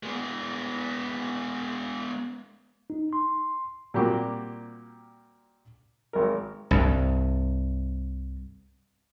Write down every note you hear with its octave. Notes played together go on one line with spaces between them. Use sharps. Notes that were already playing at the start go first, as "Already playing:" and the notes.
G#3 B3
D#4
C6
A#2 G3 A#3 C4 F#4 G4
G#1 A#4
C2 G2